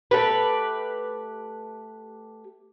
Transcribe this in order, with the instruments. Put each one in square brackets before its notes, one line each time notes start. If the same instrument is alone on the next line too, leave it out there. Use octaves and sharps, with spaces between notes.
[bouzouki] A3 G4 B4